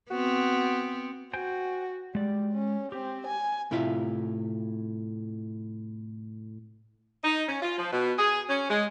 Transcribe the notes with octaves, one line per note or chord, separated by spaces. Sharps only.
B3 C4 F#4
F#4 C5 G5 G#5
G3 G#3 D5
C#4
C4 G4
G#5
A2 C3 E4 F4 E5 F5
D#4
C#4
F4
F3
B2
G#4
C#4
G#3